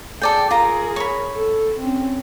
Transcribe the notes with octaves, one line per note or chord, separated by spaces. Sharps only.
G#4 A4 D5 G5
F4 G#4 A#4 A#5
C#5 B5
A4
C4 C#4